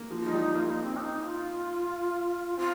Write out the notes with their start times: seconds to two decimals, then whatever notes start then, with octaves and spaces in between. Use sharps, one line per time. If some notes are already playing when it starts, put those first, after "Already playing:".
Already playing: A#3
0.10 F3
0.22 F3 D#4
0.33 G3
0.55 A#3 F4
0.69 D#4
0.83 C4
0.97 D#4
1.23 F4
2.57 C4 F4